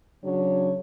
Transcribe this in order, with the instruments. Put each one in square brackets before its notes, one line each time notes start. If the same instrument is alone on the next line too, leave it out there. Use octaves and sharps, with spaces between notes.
[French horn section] C#3 F#3 D4 C#5